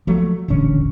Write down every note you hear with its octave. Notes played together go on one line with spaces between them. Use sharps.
F3 F#3 A3
D#1 A1 D3 C#4